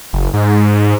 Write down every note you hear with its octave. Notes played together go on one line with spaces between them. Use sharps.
F#1
G#2